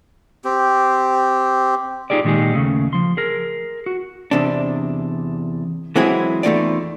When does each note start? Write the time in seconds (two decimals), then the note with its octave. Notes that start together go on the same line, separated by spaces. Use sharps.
0.45 C4 G4
2.10 D#4 F4 G4 G#4 D5
2.24 A#2 D#3 G#3 D#4 G4 G#4
2.54 D#2 C#3 A3
2.93 F3 C6
3.17 G#4 A#4
3.86 F#4
4.31 E2 C3 D4
5.96 E3 F#3 G#3 C4 E4 G#4
6.43 E2 G2 A3 D#4 F4 D5